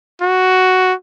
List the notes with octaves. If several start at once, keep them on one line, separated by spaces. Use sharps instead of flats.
F#4